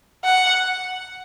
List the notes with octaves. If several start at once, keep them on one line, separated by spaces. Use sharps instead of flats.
F#5